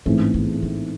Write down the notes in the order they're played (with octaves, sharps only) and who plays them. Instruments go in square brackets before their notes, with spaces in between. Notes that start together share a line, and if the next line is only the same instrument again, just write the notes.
[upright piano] A1 G#2 E3 A3 C4 [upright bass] C#4
[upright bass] B3
B3